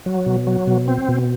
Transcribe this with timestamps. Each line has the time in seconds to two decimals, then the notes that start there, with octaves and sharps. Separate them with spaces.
0.06 F#3
0.26 B2
0.47 F#3
0.67 B2
0.88 C4
1.08 B2